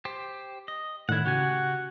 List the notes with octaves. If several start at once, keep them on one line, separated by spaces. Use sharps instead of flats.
G4 C5
D#5
A2 D#3 E4 F#5 G#6
C#3 F#4 G4 G#5